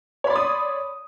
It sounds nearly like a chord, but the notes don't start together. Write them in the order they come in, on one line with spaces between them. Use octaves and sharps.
C#5 B5 D5 C6 D#6